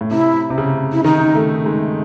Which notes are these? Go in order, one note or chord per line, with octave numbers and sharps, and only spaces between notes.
A2
C3 E4
C3
C#3
E4
D#3 D#4
A3
G#3